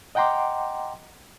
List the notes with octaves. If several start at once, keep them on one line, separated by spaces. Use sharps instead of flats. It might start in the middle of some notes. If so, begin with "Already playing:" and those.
D#5 F#5 G5 A#5 C6 D6